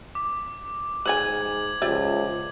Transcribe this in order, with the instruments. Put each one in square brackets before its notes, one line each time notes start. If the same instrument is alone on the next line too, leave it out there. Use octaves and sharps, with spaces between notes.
[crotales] D6
[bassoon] G#2 [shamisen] B4 C#5 G#5 [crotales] G#6 F#7
[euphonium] C#2 [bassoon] F3 [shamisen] G4 D5 E5